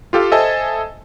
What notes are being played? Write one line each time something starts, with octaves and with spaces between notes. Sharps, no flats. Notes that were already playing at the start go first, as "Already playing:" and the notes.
F4 G4 A4 F5
A4 C5 D#5 E5 G#5 A5